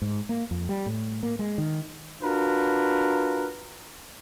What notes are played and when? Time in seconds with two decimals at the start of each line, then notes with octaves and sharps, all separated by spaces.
0.02 G#2
0.29 A#3
0.51 F2
0.69 G3
0.86 A2
1.23 A#3
1.39 G#3
1.58 D#3
2.22 D4 F4 F#4 A#4 B4